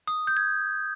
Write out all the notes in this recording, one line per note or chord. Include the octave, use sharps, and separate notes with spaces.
D#6
G6
G#6